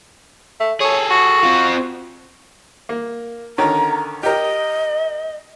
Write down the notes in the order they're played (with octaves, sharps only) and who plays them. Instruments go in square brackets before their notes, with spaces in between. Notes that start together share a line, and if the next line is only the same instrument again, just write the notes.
[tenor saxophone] A3
[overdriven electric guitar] G#4 A4 [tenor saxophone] C#5
[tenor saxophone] F#4
[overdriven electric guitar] C4 F4
[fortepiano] A#3
[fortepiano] D3 D#3 C#4 [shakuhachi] A#5
[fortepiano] G4 A#4 [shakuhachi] D#5